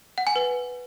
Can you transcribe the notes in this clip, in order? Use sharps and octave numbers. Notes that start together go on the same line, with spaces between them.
F#5
G#5
B4